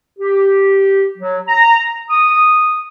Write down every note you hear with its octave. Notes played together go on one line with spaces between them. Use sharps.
G4
F#3
A#5
D#6